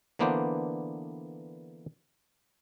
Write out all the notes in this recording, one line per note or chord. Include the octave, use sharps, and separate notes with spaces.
D3 E3 A#3 B3 D4 C5